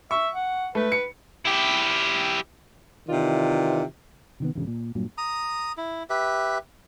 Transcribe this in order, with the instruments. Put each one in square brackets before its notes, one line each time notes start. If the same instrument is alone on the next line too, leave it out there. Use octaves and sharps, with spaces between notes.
[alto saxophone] E5 [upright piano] C#6
[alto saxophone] F#5
[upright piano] A3 [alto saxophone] B4
[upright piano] C#7
[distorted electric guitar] E4 G4
[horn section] C3 D#3 E3 F4 D5
[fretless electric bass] C3 D#3 B3
E1 A1 D2 C#3
A#2
G2 A#2 F#3
[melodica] A#5 D#6
E4
G4 B4 E5